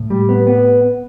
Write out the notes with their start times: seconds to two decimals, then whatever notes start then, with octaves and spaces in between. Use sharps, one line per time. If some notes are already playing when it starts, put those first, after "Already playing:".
Already playing: A2
0.10 G3
0.29 B3
0.47 B3